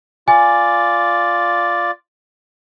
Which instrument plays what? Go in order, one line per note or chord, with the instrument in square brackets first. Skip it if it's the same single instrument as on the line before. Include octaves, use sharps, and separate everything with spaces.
[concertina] F4 D5 [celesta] G#5